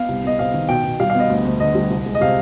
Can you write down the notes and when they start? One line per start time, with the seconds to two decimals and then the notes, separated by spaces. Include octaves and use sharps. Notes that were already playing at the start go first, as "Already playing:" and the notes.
Already playing: B3 F5
0.09 C2
0.24 B3 D#5
0.39 C3 F5
0.54 D#3
0.69 B2 G5
0.84 B2
1.00 G3 F5
1.10 F5
1.15 B3 D#5
1.30 D2
1.45 D2
1.60 D3 D#5
1.75 G3
1.90 C2
2.06 G#3
2.15 D#5
2.21 C3 F5